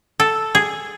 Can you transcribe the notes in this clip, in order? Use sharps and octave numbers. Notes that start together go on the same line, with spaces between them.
A4
G#4